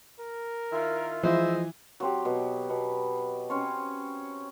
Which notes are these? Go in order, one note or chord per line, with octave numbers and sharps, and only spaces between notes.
A#4
D#3 E4 F4
E3 F3 G#3 F4 C5 D#5 E5
F#3 C4 G4
B2
B2
C4 C#4 C#5